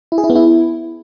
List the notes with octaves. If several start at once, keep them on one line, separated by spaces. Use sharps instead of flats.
E4
G#4
E4
B3
E4